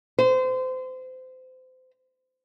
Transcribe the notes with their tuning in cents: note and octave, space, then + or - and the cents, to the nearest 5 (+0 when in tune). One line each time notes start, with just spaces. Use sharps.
C5 -30